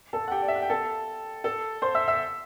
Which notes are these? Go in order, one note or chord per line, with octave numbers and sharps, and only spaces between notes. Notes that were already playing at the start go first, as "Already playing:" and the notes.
A4 A5
F#5
G4 G5
D5
E5
F#5
G5
A4 A5
A4 A5
C5 C6
E5 E6
E5 E6